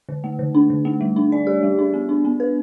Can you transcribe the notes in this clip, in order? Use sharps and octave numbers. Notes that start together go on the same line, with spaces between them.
D3
A3
D3
D4
D3
A3
G3
D4
D5
G4
G3
D4
B3
D4
B3
B4